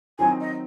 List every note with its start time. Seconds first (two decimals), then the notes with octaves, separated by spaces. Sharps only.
0.19 D#3 F#3 C4 D#4 G#5
0.41 D#5